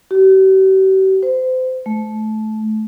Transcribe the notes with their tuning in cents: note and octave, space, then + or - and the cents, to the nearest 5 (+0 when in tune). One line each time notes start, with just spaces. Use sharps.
G4 -45
C5 -30
A3 -20